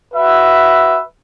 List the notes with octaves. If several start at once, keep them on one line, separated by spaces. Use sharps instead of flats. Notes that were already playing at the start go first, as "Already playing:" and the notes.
F#4 B4 E5